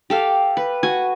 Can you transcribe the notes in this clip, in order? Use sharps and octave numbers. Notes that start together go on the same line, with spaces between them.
G4 A4 F5
B4
F#4 G#5